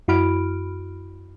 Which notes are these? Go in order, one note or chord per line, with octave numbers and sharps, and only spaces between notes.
F#2 E4 F#4 B5 F6 D7